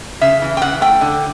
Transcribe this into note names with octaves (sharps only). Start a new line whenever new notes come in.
C#3 E5
E3
G5
C#3 F#5
A3 G5
D3